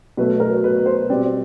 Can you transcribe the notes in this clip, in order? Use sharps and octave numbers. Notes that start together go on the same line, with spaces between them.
B2 F#3 A3 B4
A#4
B4
C5
B2 G3 C4 D5